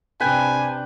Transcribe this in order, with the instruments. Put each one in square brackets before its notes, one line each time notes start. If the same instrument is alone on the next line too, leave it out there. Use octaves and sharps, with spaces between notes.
[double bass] C3 D4 [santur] B4 G5 [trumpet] G#5